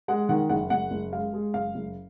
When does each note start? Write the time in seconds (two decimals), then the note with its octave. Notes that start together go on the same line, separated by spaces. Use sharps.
0.08 G#3 F#5
0.29 D#3 F#5
0.49 F#1 F#5
0.70 F#1 F#5
0.91 F#1
1.12 G#3 F5
1.33 G#3
1.54 F#1 F5
1.75 F#1